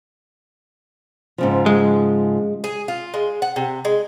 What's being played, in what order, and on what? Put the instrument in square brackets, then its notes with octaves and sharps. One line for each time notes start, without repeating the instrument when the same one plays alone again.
[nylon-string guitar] G#2 C#3 F3
[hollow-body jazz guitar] G#3
[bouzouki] G#4
F4
G#3
F#5
C3
G#3